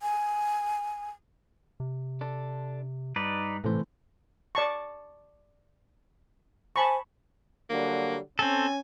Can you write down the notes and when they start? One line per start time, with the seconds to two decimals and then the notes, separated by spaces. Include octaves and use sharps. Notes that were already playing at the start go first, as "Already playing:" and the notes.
0.02 G#5
1.80 C3
2.21 D4 A4
3.16 G2 D#4 B4 D5
3.64 A2 C3 E3 A3 C5
4.55 D5 A5 C#6
6.76 C5 G#5 A5 B5 C#6
7.70 D3 F#3 G3 A#3
8.39 C4 C#4 A4 G#5